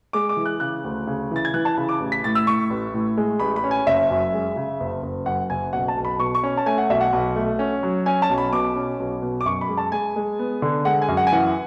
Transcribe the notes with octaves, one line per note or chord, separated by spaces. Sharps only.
G#3 D6
D6
E3
F#6
C#3 F#6
D2
C#3
E3 A6
G#6
E3 F#6
A5
C#3 B5
D6
A1
B6
A2 A6
E6
A2 C#6
A1
A2
G#3
A1 B5
B5
C#4
G#5
F#1 E5
F#2
G#3
C#3
F#1
F#1
F#2 F#5
F#1 G#5
B1 F#5
A5
B1
B5
B2 C#6
C#6
C#4
A5
A3 G#5
F#5
B1 E5
F#5
B1
A3
C#4
F#3
C#4 G#5
A5
B1
B5
B2 D6
C#4
B1
B2
D6
F#2 C#6
B5
G#3
A5
G#3 G#5
G#3
B3
D3
G#3 F#5
G#5
F#2
F#5
G#5
E3 F#5